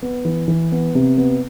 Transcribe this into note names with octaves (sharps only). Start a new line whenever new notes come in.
B3
E3
E3
B3
C3
B3